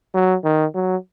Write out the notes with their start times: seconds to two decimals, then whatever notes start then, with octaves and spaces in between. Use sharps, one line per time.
0.14 F#3
0.44 D#3
0.75 F#3